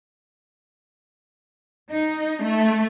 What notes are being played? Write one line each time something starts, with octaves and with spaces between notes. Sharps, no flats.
D#4
A3